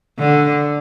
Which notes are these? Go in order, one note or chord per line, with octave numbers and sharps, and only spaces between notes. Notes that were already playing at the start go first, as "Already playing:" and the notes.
D3